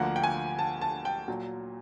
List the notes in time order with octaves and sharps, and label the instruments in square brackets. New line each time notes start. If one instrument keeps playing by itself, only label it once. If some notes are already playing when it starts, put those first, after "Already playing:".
Already playing: [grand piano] D2 D3 F3 A#3 F#5
G5
G#5
A5
A5
G5
A#2 F#3